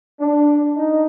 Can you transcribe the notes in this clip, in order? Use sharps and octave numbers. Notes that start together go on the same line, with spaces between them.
D4
D#4